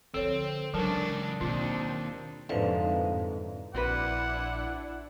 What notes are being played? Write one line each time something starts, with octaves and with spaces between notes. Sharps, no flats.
D3 F3 C4 A4 C#5
C#3 E3 F#3 G#3 D4 D#4 A#4 A5
D#2 B2 C4 D4 D#4 F4
C2 F2 G#2 D3 F3 B4 E5 F5
A#1 C4 D4 E4 F#4 B4 D5 F#5